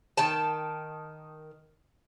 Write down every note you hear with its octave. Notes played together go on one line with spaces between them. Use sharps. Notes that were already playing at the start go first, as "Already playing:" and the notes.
D#3 G5 A5